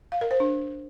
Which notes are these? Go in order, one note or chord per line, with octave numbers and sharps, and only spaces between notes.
F5
A#4
C5
D4